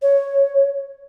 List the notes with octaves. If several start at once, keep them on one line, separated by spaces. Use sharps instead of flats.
C#5